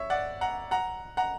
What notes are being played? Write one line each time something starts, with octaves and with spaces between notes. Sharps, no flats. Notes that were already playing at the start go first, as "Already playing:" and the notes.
Already playing: C#5 E5
D5 F#5
F#5 A#5
F#5 A#5
F#5 A#5